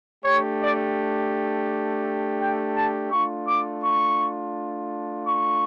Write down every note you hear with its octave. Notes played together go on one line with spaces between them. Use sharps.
A3 D4 G4 C#5
D5
G5
A5
A3 D4 F4 C#6
D6
C#6
C#6